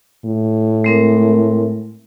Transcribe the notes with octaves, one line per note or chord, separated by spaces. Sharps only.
A2
G#3 C4 A#4